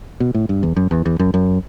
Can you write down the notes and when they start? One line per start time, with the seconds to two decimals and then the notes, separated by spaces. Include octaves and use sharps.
0.20 B2
0.34 A2
0.49 G2
0.63 E2
0.76 F#2
0.91 E2
1.06 E2
1.19 F#2
1.34 F#2